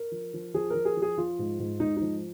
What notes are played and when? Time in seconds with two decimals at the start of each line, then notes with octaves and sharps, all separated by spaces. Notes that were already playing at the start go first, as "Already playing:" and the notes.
Already playing: A#4
0.12 F3
0.34 F3
0.54 F3 G#4
0.70 F3 A#4
0.85 G#4
0.97 F3
1.02 G#4
1.18 F3 F4
1.39 G#2
1.59 G#2
1.80 G#2 D#4
1.97 F3 D#4